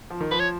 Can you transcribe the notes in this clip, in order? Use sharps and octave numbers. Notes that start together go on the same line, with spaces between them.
F3
D#3
F3 B4
C#5